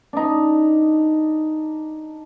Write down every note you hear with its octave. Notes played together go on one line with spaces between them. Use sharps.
D4 D#4